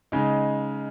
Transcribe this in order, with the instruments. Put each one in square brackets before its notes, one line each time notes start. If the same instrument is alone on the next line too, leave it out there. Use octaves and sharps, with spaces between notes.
[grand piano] C#3 G#3 D#4